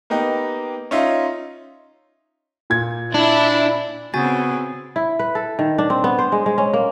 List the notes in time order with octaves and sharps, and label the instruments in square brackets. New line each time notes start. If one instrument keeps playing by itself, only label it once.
[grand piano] A#3 B3 D#4 G4
C#4 D#4 F4 E5
A#2 G#6
[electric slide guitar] D4 [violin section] E4
[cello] C#3 C4 [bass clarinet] B3 [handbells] F#4 G#5 A6
[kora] E4
B4
A4
D#3
D4
C4
B3
C5
G#3
G#3
C#4
A#3